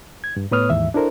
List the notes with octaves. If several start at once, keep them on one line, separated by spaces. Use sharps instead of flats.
G#6
G2
A2 B3 B4 C#5 D#6 F6
D#2 G#2 E3 E5
D4 E4 A4 A#4 C5